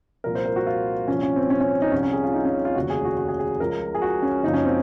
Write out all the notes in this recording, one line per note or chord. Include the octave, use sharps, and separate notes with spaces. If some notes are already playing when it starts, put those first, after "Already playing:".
C2 A#2 F3 A#4
C5
A#4
F#4
F4
C2 A#2 F3 C#4
C#4
C4
C#4
C#4
D#4
C2 C3 F3 C#4
C#4
G#4
F4
D#4
C#4
F4
F1 D#2 C#3 F#4
G#4
F#4
F#4
G#4
G#4
C#2 C#3 F3 A#4
G#4
F#4
C#4
F#1 F#2 C#3 F3 D#4
C#4
C4